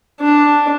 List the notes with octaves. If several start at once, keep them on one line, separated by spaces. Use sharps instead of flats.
D4